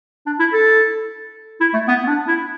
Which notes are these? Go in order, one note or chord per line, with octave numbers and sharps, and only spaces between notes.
D4
E4
A4
E4
A3
B3
B3
D4
E4